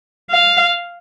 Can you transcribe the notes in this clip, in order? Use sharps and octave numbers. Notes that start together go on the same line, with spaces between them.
F5